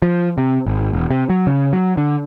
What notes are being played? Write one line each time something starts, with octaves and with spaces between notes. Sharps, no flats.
F3
C3
G#1
E1
C3
F#3
C#3
F#3
D3